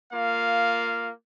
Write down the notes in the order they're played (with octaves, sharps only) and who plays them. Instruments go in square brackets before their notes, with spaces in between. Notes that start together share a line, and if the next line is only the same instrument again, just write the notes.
[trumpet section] A#3 F4 F5